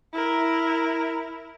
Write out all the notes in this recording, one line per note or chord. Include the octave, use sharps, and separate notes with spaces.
E4 A#4